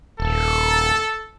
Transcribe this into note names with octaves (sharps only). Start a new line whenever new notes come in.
D#1 A4